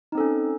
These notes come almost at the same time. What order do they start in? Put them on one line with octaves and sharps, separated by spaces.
D#4 C4 A4 C#4